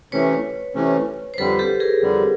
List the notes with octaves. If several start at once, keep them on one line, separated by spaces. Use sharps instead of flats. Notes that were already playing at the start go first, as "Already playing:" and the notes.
C3 E3 A3 C#4 B4 C#5
C3 E3 A3 C#4
C5
F2 D3 G3 A4 B4
G4 A4
G#4 A#4
F2 D3 G3